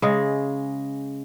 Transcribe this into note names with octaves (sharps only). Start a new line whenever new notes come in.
C#3 G#3